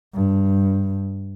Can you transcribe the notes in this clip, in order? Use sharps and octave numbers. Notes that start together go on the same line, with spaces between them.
G2